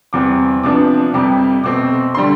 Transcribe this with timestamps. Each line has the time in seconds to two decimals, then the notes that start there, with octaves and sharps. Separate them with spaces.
0.13 E2 C3 G3 C4 D6
0.63 C3 F3 B3 D4 D6
1.14 F2 C3 G3 D6
1.64 B2 A3 C4 D6
2.15 D3 G3 C6